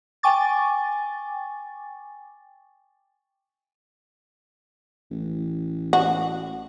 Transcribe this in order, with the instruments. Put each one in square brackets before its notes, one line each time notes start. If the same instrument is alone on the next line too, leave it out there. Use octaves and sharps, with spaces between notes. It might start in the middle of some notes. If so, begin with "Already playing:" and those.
[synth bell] G5 G#5 C#6 D6 A6
[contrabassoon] A1
[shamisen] F#4